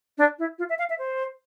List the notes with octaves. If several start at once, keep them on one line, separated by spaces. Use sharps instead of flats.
D4
E4
F4
E5
F5
E5
C5